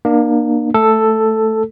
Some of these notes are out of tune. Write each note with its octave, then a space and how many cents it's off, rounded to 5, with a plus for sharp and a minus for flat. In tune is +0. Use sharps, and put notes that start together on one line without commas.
A#3 +20 D4 +40
A3 +0 A4 +5